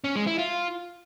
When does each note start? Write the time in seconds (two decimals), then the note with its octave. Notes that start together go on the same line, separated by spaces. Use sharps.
0.04 C#4
0.16 G#3
0.27 E4
0.38 F4